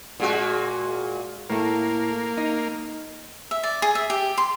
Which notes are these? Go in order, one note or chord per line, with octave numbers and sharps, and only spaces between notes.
A#2 G#3 F#4
A2 A3 A#3
D#4
E5
D5
G#4
E5
G4
C6